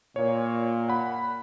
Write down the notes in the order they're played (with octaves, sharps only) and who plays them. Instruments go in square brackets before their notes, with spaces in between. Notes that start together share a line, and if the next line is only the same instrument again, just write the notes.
[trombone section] A#2 [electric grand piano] C#5
[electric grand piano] F#5 B5